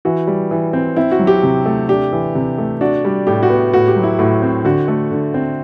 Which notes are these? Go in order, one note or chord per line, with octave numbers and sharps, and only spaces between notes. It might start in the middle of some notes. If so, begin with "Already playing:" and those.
E3 F#4
G3
E3
C4
C4 E4
F#4
F#3
G4
C3
A3
D4 G4
E3
C3
A3
D4 F#4
G3
A2 G4
F#4
B3
A2 F#4
G4
F#3
E4
A2 F#4
C4
D3 F#4
A3
D3
C4